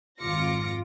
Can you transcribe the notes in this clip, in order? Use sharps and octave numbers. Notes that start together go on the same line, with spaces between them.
G#1 F2 F4 D6 A#6 C#7